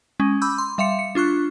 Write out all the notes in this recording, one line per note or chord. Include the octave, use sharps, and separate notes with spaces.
G#3 C#4
B5 D6 E6 G6
C6
G3 E5 F5 C6 C#7
C#7
D4 F4 C#6 F#6